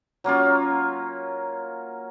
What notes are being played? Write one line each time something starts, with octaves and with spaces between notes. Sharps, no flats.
F#3 A#3 C#4 F4